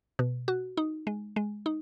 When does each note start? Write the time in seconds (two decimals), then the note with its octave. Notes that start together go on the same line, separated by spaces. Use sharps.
0.19 B2
0.48 F#4
0.77 D#4
1.07 G#3
1.36 G#3
1.66 D#4